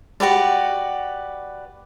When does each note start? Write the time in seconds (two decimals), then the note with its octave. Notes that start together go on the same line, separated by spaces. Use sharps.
0.20 F#4 G4 B4 D5